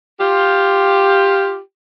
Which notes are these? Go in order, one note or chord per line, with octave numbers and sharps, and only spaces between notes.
F4 G4